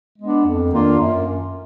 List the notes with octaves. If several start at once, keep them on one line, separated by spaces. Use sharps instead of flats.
G#3 B3 D4
F2
D#3 A#3 D4 F4
F#2